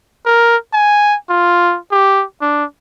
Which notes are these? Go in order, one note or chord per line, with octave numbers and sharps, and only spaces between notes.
A#4
G#5
F4
G4
D4